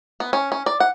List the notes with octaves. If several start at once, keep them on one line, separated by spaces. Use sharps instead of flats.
B3
C#4
C#4
D5
F#5